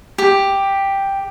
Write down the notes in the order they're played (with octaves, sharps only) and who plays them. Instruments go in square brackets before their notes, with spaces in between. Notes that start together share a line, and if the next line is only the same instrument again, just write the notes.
[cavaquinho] G4